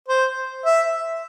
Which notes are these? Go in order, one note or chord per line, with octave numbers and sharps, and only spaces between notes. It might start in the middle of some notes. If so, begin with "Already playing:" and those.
C5
E5